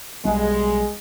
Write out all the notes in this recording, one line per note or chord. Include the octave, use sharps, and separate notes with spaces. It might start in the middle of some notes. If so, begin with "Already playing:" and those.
B1 G3 G#3